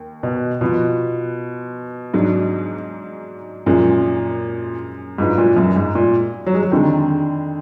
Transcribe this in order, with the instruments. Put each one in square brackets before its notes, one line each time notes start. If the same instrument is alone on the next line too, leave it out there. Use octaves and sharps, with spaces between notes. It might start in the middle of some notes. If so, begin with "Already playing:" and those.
Already playing: [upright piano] D#2
[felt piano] B2
[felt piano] B2 [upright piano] F3 B3 F4
[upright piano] G#2 F#3 D4
[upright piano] F#2 F3 G#3 [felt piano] A#2
[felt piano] G#2 [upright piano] F#3 D4 F4 B4 F5
[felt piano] A#2
F#2
G#2
A#2
F#3
G#3
F#3
[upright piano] F2 D3 G#3 [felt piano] D#3